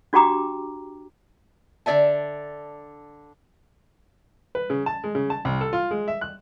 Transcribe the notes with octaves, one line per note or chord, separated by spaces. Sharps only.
D4 F#4 G4 G5 A#5 D6
D3 A#4 D5 E5 A5
B4
C#3
A5
G#3
C#3
A5
C2
A4
F4
G#3
E5
F#6